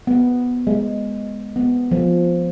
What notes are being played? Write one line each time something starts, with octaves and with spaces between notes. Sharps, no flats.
B3
G#3
B3
F3